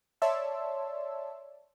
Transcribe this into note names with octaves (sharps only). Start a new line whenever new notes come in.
C#5 D5 E5 A5 C6 E6